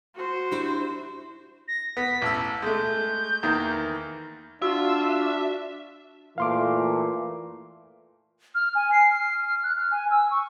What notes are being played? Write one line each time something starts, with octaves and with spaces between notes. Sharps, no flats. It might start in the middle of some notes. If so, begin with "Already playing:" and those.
F#4 C5
D4 E4 G4
A#6
B3 B6
A1 A5 E6
G#3 A3 G6
E2 D#3 A#3
D4 F4 F#4 E5
A#2 E3 A3 F5 C6 D6
F6
G#5
C7
F6
F6
F#6
F6
G#5
E6
C#6